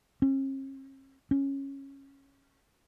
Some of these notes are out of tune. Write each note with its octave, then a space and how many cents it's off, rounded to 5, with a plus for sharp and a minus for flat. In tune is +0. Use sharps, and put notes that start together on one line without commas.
C#4 -45
C#4 -10